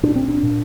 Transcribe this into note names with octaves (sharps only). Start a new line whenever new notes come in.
A#2 D4
C4
D4
A#2